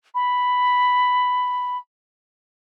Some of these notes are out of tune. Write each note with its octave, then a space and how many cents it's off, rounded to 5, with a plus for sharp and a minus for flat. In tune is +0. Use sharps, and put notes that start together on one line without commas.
B5 +5